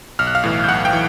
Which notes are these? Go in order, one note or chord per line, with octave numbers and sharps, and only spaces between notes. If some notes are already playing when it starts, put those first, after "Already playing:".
B1 F6
F#6
F5 F6
A2 E3
G6
B1 F#5 F#6
G5 G6
E3